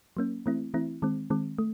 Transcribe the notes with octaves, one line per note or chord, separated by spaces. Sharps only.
F#3 A#3 C#4
E3 A3 C4 E4
E3 A3 C4 E4
D#3 G#3 C4
D#3 G#3 C4
A3